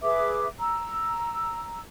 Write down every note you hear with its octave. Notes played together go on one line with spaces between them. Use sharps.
G#4 B4 E5 D6
A#5 E6